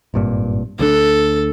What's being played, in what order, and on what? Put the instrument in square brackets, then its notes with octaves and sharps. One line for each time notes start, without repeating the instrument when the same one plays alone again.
[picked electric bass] G#1 G2 A#2
[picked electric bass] D2 G3 D4 [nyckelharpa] A4